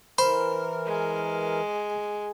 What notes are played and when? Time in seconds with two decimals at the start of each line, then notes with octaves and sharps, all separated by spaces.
0.18 E3 A#4 C5 B5
0.86 G#3